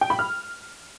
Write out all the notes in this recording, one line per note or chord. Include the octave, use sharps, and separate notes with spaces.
G5
B5
F6